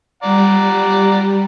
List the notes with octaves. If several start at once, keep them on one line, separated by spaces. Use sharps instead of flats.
G3 D5 F#5 A#5